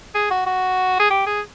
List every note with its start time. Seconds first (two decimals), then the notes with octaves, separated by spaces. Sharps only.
0.15 G#4
0.31 F#4
0.46 F#4
0.99 G#4
1.10 G4
1.26 G#4